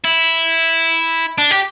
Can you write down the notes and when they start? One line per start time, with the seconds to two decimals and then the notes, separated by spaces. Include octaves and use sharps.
0.04 E4
1.38 D4
1.51 G4